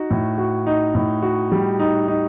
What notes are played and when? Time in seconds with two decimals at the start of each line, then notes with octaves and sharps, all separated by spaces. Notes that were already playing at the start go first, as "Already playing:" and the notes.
Already playing: D#4 F#4
0.11 A2
0.38 F#4
0.67 D#4
0.95 A2
1.22 F#4
1.52 G3
1.79 D#4
2.08 D#4